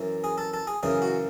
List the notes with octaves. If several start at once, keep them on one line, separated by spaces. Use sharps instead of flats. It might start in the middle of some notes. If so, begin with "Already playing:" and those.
Already playing: F#2 E3
G#4
A4
A4
G#4
F#2 C#3 E3 G#4
F#4